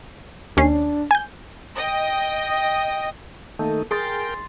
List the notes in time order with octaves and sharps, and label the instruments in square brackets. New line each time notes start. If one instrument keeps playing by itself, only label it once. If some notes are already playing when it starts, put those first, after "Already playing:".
[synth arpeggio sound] D#2 C#4 C7 [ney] D4
[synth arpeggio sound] G#5 G6
[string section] D#5 G5
[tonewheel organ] D#3 A3 D#4 [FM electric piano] A#3 A4
[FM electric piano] G#4 [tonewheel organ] A#4 G5 [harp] C6 A6